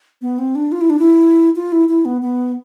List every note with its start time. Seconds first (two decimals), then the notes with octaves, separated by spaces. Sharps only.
0.22 B3
0.39 C4
0.55 D4
0.72 F4
0.81 E4
0.90 D4
0.99 E4
1.56 F4
1.72 E4
1.89 E4
2.05 B3
2.22 B3